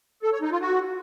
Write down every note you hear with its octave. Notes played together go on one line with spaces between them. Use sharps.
A4
C#5
D#4
F4
F#4